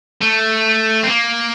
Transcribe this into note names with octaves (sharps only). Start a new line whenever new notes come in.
A3
C4
A#3